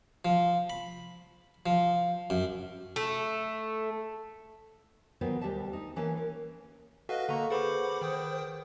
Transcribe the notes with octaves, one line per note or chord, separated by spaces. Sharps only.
F3
B5
F3
F#2
A3
D#3 E3 F#3 B3 B4 C5
D2 G3 G4 E5 A5
D#4
E3 A#3 C#4 B4 E5
A#4
F#4 A4 B4 D#5 F5 F#5
D3 A#3 A4 A#5 C#6
G#4 B4 C5 F#5 B5 D6
D#3 G5 D#6